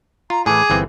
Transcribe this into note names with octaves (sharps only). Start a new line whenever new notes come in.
F4 A#5
A2 E3 G#4 D6
G1 E3 C4